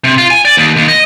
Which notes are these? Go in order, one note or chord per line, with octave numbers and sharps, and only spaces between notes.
C3
F4
G#5
D5
D#2
D#2
D#5